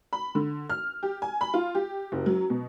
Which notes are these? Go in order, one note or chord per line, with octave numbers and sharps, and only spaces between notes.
B5
D3
F6
G4
G#5
B5
F4
G4
F#1
F#3
B2